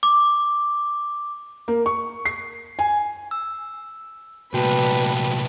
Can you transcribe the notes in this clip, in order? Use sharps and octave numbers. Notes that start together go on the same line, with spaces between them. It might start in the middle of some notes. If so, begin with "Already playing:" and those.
D6
A#3
C#6
C7
G#5
E6
C2 A#2 F#4 B4 G5 A5